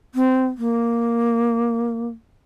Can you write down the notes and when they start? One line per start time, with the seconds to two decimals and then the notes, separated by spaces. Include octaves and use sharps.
0.15 C4
0.58 A#3